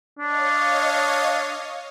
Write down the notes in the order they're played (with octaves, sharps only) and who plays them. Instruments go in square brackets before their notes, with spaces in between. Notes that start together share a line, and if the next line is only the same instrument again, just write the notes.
[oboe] D4 [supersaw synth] C#5 D#5 F5